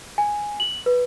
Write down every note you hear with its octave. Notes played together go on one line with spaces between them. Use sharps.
G#5
F#7
B4